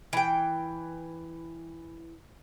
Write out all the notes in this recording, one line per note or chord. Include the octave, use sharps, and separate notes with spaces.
E3 G5